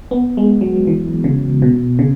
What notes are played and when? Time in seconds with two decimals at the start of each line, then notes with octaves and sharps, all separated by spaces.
0.11 B3
0.37 G#3
0.61 F#3
0.87 E3
1.24 C#3
1.62 B2
1.99 C#3